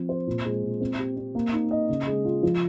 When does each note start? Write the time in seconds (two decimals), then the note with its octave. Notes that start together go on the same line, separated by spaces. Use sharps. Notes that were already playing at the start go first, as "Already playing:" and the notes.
Already playing: F3 C4
0.09 C5
0.27 A#2
0.45 G#3
0.63 A#2
0.81 C4
0.99 G4
1.17 C4
1.35 A#3
1.53 D#4
1.71 D#5
1.89 C#3
2.07 G#3
2.25 F4
2.43 F3